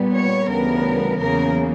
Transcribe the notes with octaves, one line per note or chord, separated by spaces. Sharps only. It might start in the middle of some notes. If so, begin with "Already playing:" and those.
Already playing: A#2 G3 B3
C#5
D2 C#3 E3 G3 B3 A#4
E2 C#3 F#3 A#3 A#4